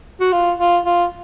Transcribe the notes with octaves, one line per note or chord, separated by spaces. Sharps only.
F#4
F4
F4
F4